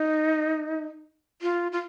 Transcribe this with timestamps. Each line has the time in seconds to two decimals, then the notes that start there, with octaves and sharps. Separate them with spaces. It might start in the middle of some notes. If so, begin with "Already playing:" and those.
Already playing: D#4
1.42 F4
1.72 F4